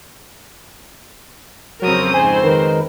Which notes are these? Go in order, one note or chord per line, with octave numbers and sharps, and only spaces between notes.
F2 C#3 F#3 C4 A#4 D#6
G#2 C5 G#5
D#3 G#3 A#4 B4